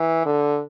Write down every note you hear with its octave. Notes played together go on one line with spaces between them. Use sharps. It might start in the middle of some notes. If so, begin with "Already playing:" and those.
Already playing: E3
D3